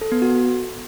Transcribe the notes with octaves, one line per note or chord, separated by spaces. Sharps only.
A4
B3
F#4